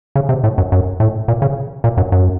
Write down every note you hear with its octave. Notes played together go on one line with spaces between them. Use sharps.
C#3
C3
A2
F#2
F#2
A2
A#2
C#3
A#2
F#2
F#2